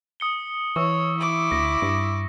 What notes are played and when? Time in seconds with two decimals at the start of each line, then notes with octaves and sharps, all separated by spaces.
0.20 D#6 C#7 G7
0.76 E3 C#5 C#6 E6
1.17 E4 D6
1.52 D2 A#6 B6
1.82 G2